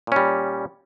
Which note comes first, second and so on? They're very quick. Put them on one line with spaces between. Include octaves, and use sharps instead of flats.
A#2 C#4 G3